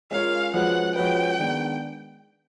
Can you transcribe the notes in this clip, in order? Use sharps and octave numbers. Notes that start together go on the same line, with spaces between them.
G#3 C#4 F4 A#4 C#5 F5
F3 G#3 C#4 F#4 B4 F#5
F3 G#3 C#4 F#4 B4 G5
D#3 G#3 B3 D4